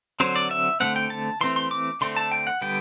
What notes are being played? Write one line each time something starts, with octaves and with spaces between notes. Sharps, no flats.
D3 F#3 C4 C5
D5
E5
D3 A3 C4 F#5
G5
A5
E3 A3 C4 C6
C6
D6
D3 A3 C4 C6
A5
G5
F#5
D3 G3 B3 G5